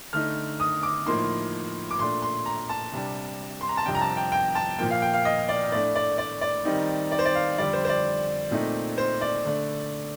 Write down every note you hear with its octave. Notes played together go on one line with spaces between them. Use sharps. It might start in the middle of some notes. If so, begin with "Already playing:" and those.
D3 A3 D#4 F6
D#6
D6
A2 F3 A#3 D#4 C6
D6
A#2 A3 D4 C6
C6
A#5
A5
C3 G3 D4
C6
A#5
A5
F2 C3 G3 D4 G5
A#5
A5
G5
G5
A5
A#2 F3 A#3 G5
F5
G5
F5
D#5
D5
A2 A3 D4 D5
D5
D5
D5
D#3 G3 C4 D#4
D5
C5
D5
F5
F2 D3 G3 D5
C5
C5
D5
A#2 A3 C4 D#4
C5
D5
D3 A3 D4